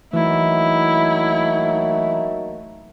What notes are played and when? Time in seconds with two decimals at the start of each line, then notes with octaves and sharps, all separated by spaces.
0.13 E3 F#3 A3 A#3 D#4 E4